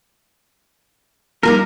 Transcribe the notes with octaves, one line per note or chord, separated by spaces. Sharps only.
F3 G3 A#3 D#4 A#4